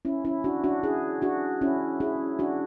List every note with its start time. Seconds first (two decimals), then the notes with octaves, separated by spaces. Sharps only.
0.05 C#4 E4
0.25 C#4 E4
0.44 D4 F#4
0.64 D4 F#4
0.83 E4 G#4
1.22 D4 F#4
1.61 C#4 E4
2.00 E4 G#4
2.39 D4 F#4